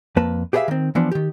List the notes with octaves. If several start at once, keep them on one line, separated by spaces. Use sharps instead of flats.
F2 A#3 B4 A5
G4 G#4 B4 C#5 E5 F5
D#3 C4
E3 F3 B3 D4
D#3 G4